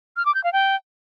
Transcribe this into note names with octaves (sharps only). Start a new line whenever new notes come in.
F6
D6
G6
F5
G5